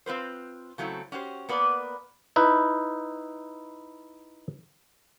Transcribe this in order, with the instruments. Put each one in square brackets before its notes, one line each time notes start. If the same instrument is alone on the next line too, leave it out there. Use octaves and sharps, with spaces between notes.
[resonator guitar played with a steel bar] C4 F4 B4 C5
C#3 F#3 A3 C4 E4
C#4 F#4 G4 C5
A#3 B3 B4 D5
[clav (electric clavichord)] D#4 E4 B4